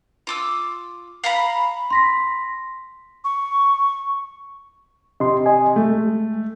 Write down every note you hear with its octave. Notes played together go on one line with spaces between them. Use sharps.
F4 D6 E6
F5 A#5 B5
C6 A#6 B6
C#6
C3 D#5 C6
D#5 G#5
G#3 A3